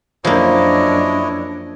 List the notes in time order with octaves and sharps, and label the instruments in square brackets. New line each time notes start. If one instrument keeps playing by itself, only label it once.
[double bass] F#2 D4 [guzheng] F3 A#3 [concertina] E4 C#5 D#5